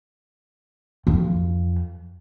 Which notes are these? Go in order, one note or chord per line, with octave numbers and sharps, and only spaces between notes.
F2